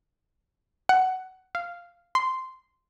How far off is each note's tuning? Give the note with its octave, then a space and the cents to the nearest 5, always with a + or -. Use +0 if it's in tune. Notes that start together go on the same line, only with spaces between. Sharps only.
F#5 +15
F5 -5
C6 -10